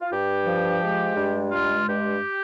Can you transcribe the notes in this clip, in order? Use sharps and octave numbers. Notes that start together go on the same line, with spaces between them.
F4
G2 G4
F3
G#3
G2
G#3 F4
G2 G4